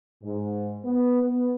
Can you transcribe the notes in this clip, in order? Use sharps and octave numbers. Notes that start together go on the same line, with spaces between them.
G#2
B3
B3